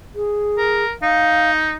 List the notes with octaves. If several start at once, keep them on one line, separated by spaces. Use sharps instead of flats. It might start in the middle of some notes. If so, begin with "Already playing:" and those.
G#4
A#4
D#4 F5